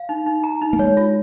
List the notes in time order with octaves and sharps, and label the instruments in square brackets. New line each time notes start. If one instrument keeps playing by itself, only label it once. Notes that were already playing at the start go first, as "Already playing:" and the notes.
Already playing: [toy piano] F5
D#4
D#4
A#5
D#4
[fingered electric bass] A#3
[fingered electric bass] G#3 [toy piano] C#5
[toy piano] F4